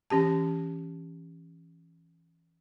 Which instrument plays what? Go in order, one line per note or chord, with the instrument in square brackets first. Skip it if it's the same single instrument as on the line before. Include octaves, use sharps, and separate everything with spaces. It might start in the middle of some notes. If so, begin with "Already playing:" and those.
[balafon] E3 C#4 G4 A5